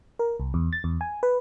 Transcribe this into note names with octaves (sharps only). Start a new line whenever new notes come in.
A#4
C2
E2
A6
E2
G#5
B4